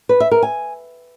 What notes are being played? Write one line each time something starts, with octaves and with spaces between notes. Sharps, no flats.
B4
E5
A#4
G#5